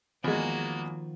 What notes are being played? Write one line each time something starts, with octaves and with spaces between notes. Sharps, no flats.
E2 D#3 F3 G#3 A#3 F#4